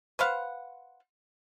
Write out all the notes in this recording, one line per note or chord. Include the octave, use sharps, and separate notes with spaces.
B4 C5 F5 F#5